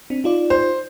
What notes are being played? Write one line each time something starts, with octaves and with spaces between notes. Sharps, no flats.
C4 D4
D#4 F4 D5
C5